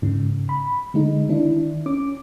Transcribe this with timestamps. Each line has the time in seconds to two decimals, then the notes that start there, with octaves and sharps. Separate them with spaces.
0.02 G#2 C#3
0.49 B5
0.94 D3 G#3 D#4
1.29 D#3 D4 E4
1.86 C#4 D6